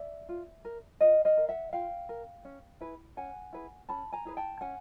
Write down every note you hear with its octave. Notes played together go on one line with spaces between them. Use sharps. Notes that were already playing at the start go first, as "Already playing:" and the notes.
Already playing: D5 E5
F4
A#4
F4 D#5 F5
D#5 F5
A#4
E5 F#5
F4 F5 G5
A#4
C#4
E4 G#4 B4
C#4 F#5 G#5
E4 G#4 B4
C#4 A5 B5
G#5 A#5
E4 G#4 B4
G5 A5
C#4 F#5 G#5